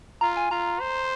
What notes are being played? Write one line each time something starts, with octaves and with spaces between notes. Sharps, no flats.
F4 A#5
G#5
F4 A#5
C5